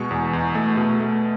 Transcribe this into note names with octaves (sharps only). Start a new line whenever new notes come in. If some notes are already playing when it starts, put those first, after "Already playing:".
Already playing: B2 G#3 C#6
E2
E2
A3
B2
A3